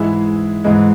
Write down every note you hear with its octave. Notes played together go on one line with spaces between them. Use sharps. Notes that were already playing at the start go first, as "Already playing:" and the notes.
Already playing: G#2 E3 G#3 E4 G#4
G#2 E3 G#3